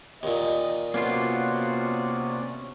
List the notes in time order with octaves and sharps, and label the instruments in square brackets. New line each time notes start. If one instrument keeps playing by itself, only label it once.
[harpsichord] D#2 A#2 [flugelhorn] D#5
[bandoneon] C3 C#4 D5 [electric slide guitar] A#3 B3 F4 [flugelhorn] F#4